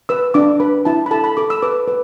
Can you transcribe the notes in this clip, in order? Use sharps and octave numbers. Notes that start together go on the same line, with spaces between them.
B4 E6
D4 D6
B4 B5
E4 A5
B5
A4 A5
B5
A4 D6
E6
B4 D6
B4